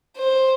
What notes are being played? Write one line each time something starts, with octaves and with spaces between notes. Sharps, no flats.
C5